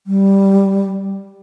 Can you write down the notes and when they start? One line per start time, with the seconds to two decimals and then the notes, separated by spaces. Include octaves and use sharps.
0.07 G3